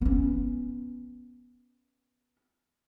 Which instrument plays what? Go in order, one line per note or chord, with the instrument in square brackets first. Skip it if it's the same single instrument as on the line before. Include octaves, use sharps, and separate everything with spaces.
[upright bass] B3 C#4